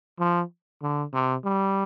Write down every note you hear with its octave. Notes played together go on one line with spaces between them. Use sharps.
F3
D3
C3
G3